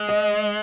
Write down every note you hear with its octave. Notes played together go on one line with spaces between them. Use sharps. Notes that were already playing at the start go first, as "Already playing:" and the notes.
Already playing: G#3
D#5